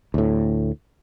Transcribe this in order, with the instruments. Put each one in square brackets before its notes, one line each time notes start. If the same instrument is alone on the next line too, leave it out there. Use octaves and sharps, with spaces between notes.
[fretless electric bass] D2 A2